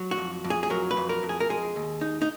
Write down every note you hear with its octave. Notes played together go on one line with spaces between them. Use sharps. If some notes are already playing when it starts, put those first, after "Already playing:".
Already playing: F#3
F#4
F2
F2
G#4
G#4
F#3 A#4
B4
F2
A#4
F2
G#4
A#4
G#3 G#4
D#2
D#4
D#4